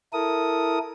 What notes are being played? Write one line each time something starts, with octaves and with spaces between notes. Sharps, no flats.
E4 A4 A#4 D#6